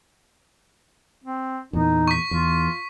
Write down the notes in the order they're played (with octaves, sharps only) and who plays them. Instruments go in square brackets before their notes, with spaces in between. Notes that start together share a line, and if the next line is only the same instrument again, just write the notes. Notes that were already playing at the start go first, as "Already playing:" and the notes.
[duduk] C4
[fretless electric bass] E2 A#2 [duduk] D#4
[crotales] C#6 B6
[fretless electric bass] E2 [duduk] F4